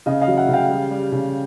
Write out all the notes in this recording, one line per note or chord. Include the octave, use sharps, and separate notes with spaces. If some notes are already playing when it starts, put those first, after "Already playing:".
C#3 D#5 F5
D#5 F5
F#3
E5 F#5
C#3
F5 G5
G3
G3
C#3